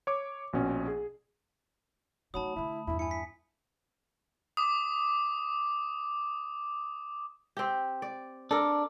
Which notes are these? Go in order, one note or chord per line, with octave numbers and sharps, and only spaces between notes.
C#5 D6
A#1 B2 C#4
G#4
F#3 A3 D#4 A5 B5 D#6
D3 A3 E4
E2 G2 E4
E4 G#5 C#7
B6
D6 D#6
C4 G4
D5
D4 A4 A#4